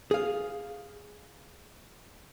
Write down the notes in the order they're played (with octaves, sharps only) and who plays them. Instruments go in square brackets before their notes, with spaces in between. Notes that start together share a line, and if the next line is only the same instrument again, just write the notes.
[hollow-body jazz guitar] G#4 F5